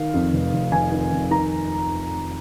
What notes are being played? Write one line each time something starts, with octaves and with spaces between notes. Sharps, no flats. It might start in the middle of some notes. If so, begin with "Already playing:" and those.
Already playing: D#3 F5
F2
F1
F1
F1 G#5
D#3
F2
D#3 A#5